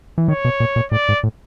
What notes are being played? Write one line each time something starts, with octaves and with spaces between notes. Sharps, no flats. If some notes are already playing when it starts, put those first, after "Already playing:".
E3
D#3 C#5
B2
A#2
A#2
A2 D5
G#2
A2